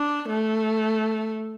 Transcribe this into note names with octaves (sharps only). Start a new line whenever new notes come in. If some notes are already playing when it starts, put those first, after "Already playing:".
Already playing: D4
A3